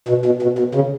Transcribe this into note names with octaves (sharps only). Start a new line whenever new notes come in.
B2
B2
B2
B2
C#3